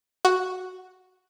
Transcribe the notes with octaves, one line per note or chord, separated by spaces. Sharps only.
F#4